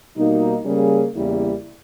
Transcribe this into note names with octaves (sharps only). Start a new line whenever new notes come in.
B2 G3 A#3 D#4
C#3 G3 A#3 C#4 G#4
E2 C#3 G3 A#3 E4